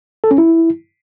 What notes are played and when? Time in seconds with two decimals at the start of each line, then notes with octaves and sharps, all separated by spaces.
0.24 A4
0.31 C#4
0.38 E4